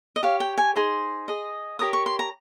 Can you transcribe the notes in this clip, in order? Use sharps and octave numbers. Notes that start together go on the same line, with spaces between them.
D#5
G4 C#5 F5
G5
G#5
D#4 G#4 C5 C6
G#4 D#5
G4 A#4 C#5 D#6
C#6
C6
A#5